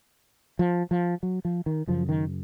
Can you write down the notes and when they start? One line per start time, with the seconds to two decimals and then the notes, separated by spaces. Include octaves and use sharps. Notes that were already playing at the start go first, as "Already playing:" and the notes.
0.59 F3
0.91 F3
1.23 F#3
1.45 F3
1.66 D#3
1.87 F#2 C#3 F3
2.09 D#3